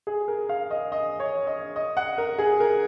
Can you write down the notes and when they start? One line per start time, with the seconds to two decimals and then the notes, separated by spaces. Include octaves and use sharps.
0.07 G#4
0.28 A#4
0.49 F5
0.71 D#5
0.92 D#5
1.20 C#5
1.47 D#5
1.76 D#5
1.97 F#5
2.18 A#4
2.38 G#4
2.60 A#4